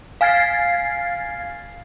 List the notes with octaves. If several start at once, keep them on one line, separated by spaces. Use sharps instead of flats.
F5 G#5 F6 G#6 A6 C7